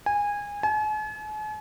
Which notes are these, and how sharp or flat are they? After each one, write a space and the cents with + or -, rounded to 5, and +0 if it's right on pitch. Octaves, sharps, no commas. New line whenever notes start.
G#5 -20
G#5 +45